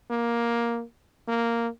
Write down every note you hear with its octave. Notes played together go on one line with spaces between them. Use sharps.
A#3
A#3